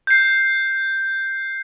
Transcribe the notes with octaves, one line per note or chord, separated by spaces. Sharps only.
G6 C7